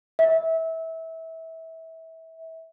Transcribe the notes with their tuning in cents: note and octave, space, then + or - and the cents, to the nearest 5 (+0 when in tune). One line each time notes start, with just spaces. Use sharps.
E5 -25